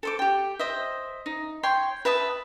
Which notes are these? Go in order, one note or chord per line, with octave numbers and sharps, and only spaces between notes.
A4 C5 D6
G4 G5
C5 D#5 E5
D#4
C#5 G5 C6
B4 E5 A5 D#6